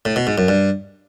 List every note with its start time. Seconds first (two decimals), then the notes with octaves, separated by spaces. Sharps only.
0.05 A2
0.16 B2
0.27 G#2
0.38 F#2
0.48 G2